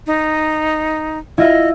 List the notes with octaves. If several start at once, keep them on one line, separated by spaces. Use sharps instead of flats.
D#4
E4 F4 D#5 E5